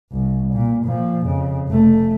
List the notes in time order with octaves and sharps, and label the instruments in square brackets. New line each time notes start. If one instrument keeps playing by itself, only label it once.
[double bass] C2
A#2
A#2 F3
F2 C#3
F1 A3